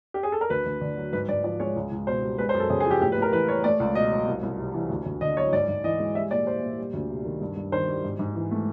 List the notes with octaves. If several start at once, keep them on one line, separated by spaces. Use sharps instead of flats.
G4
G#4
A4
A#4
D2 B4
D2
D3
F#3
G#2 B4
G#2 D5
F3 D5
G#3 C#5
C#2
C#2
B2 C5
G3
G#3 B4
C5
F#2
A4
C#3 G#4
G#4
F3
G4
A2 G4
B4
A2 A#4
E3 B4
G3 C#5
A3 D5
C#2
B2 D#5
F#3
C2
C2
C3
E3
D2
D2
D3 D#5
F#3 C#5
G#2 D5
G#2
E3 D#5
G#3
G3 E5
A#2 D5
G3 C5
A#2
G3
D2
C3
D#3
G2
G2
D#3 C5
G3
G#2
G#2
E3
A3